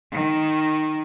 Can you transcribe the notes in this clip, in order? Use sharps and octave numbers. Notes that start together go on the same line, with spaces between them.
D#3